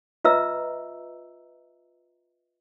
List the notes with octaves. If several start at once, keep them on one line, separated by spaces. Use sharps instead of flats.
F4 B4 D#5 E5 A#5 E6